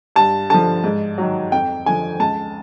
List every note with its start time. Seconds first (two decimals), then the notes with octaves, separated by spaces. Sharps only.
0.16 G2 A5
0.50 D3 F3 A5
0.84 G#2
1.18 D#3 F#3
1.52 F2 G5
1.86 D3 F3 G#5
2.20 C#2 A5